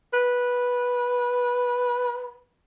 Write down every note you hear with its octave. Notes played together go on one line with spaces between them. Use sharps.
B4